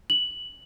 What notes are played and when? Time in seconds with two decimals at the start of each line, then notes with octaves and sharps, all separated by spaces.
0.10 F#7